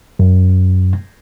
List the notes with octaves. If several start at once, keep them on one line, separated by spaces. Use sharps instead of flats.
F#2